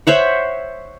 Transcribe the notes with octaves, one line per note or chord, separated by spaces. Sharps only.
C5 C#5 E5 F#5